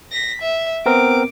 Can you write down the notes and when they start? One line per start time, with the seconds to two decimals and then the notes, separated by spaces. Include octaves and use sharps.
0.12 A#6 B6
0.42 E5
0.86 B3 C4 A#4 D6